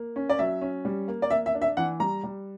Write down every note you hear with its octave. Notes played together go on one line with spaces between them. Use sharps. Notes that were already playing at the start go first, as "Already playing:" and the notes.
Already playing: A#3
C#4
D5
F#3 E5
C#4
G3
A#3
D5
A#3 E5
E5
D4
E5
E3 F#5
G3 A#5
G3